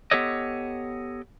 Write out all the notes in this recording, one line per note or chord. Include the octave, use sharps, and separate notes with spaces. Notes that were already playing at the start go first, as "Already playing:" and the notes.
B3 G4 A4 C#5 D#5